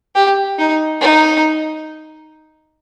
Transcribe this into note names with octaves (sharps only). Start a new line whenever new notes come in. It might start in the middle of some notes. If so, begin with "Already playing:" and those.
G4
D#4
D#4